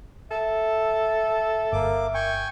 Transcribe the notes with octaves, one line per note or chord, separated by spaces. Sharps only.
A4 E5
G1 A#3 D6
G5 G#5 C#6